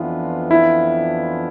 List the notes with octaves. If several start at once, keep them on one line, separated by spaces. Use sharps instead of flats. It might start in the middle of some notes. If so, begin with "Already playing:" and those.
Already playing: F2 E3 B3 D4 F4
E4